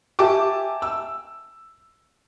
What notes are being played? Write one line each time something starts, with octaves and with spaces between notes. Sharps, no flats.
G4 E5 G#5 A5 D6
E6